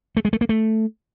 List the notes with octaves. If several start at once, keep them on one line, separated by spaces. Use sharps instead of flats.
A3
G#3
A3
A#3
A3